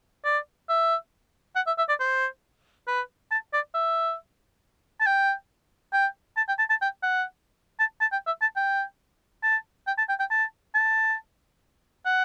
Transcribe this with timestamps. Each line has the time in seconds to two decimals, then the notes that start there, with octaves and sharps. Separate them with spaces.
0.25 D5
0.69 E5
1.56 F#5
1.67 E5
1.78 E5
1.89 D5
2.00 C5
2.88 B4
3.31 A5
3.53 D5
3.74 E5
5.01 A5
5.06 G5
5.93 G5
6.37 A5
6.49 G5
6.59 A5
6.70 A5
6.82 G5
7.03 F#5
7.80 A5
8.01 A5
8.12 G5
8.27 E5
8.42 A5
8.56 G5
9.43 A5
9.87 G5
9.98 A5
10.09 G5
10.20 G5
10.31 A5
10.75 A5
12.06 F#5